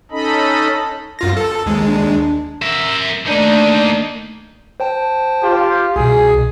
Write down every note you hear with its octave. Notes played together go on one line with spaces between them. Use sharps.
C#4 D#4 A4 D#5 B5
F#2 F4 A#6
A4
D#2 G#3
D4
A#4 E5
A3 A#3 D4 D#4
C5 G5 A5
F4 G4
C2 B2 G#4